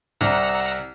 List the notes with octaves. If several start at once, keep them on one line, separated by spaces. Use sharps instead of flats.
C2 F#5 A#5 E6